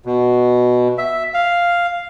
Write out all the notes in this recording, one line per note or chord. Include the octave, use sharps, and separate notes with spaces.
B2
E5
F5